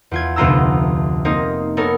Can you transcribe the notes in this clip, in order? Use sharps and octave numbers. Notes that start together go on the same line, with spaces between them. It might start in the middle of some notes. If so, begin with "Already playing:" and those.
E2 F4 G#6
F1 D2 B3 F4 A#5 E6
A#3 C4 D#4 D#5
B3 D#4 A4 A#4 C#5